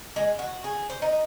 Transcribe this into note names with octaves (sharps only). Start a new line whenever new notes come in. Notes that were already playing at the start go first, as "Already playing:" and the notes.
G#3
F#4
G#4
C5
D#4